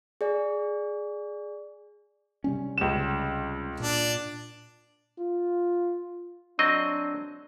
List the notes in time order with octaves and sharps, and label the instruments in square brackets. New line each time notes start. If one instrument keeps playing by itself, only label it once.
[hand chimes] G#4 D5
[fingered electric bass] C3 G3 C#4
[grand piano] C#2 E7
[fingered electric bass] A#2 [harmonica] D4
[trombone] F4
[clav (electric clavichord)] F#3 C4 D#5 [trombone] D4